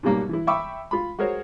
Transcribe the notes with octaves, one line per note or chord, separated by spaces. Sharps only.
G#2 B2 F#3 G3 A#3
E3 E4
E5 G5 B5 C#6 D6 E6
F4 B5
F#4 G#4 A#4 C5 C#5